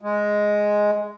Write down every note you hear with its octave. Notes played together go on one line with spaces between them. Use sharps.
G#3